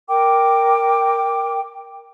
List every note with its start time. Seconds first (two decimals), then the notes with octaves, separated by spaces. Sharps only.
0.09 A#4 G5 D6